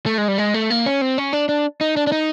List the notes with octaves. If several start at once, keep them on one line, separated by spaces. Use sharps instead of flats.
A3
G#3
G3
G#3
A3
A#3
C#4
C4
C#4
D4
D4
D#4
D4
D4
D#4